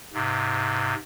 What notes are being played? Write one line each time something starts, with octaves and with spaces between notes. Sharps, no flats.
G#2 C3